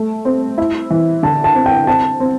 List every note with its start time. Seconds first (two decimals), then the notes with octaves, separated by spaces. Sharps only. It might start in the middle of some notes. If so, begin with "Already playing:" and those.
Already playing: A3
0.25 C4
0.58 E4
0.90 E3
1.23 D3 A5
1.44 A5
1.55 C4
1.66 G5
1.87 C4 A5
2.20 C4